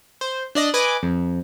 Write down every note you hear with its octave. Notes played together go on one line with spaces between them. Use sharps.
C5
D4 D5 D#5
B4 D#5 G#5 D6
F2